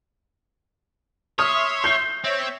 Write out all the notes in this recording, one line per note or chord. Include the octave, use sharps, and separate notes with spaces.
C#5 E5 C6 D#6 F6
G6 C7
C4 C#5 E5